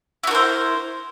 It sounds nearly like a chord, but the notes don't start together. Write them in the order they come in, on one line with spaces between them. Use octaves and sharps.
E4 F#4 A#4 C5